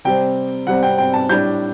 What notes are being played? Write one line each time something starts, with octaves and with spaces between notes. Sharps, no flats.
C3 G3 C4 G5
C3 G3 C4 F#5
G5
G5
A5
A2 G3 D4 G6